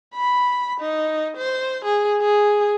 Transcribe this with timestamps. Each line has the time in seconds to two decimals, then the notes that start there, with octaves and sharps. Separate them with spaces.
0.15 B5
0.81 D#4
1.37 C5
1.85 G#4
2.21 G#4